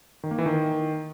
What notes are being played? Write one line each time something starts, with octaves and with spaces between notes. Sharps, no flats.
D#3
A#3
E3
D#3